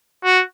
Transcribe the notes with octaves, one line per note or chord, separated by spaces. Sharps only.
F#4